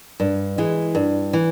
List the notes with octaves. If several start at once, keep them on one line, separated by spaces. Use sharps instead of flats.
G2
E3 G#3
G2
E3